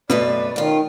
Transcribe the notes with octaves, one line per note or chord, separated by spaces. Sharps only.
F#2 B2 A3 B4 D5
D#3 C#4 F4